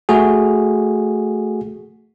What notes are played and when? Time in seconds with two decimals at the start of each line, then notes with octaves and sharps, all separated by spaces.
0.09 A3 F#4 G#4